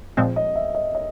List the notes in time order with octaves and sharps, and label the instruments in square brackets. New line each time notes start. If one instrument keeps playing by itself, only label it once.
[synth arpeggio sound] A#2 F3 G#3 C4
[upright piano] D#5
E5
D#5
D#5